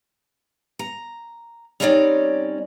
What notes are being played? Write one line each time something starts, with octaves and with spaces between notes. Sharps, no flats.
A#5
G3 C4 C#4 D#4 C#5 D5